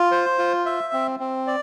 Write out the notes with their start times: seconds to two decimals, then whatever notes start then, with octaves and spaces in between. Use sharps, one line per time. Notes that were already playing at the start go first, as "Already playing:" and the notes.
Already playing: F4
0.11 C5
0.38 F4
0.66 E5
0.93 C4
1.20 C4
1.47 D5